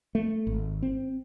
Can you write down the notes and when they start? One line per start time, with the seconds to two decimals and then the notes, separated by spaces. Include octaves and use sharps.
0.15 A3
0.47 G#1
0.82 C4